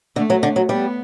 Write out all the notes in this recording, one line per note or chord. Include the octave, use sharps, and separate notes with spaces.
D3 A3
F#3
D3
F#3
G3 B3